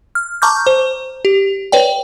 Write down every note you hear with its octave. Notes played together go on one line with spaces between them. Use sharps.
F6
A5 A#5 C#6 D6 F6 G6
C5
G4
B4 C#5 D5 G5